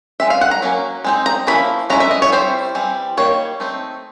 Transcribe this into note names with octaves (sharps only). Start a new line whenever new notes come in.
G#3 C4 E5
F5
F#5
A#5
F#3 A#3 C#4
G#3 C4 D#4
A#5
F3 A#3 C#4 E4 B5
G#3 C#4 E4 A#5
E5
D#5
C#5
G3 C4 E4 C5
E3 G3 C4
D#3 G3 A#3 C#5
A3 C4 D#4